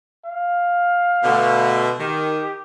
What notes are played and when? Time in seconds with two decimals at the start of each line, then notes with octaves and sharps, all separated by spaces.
0.25 F5
1.24 B2 D3 A3
1.99 D#3 G4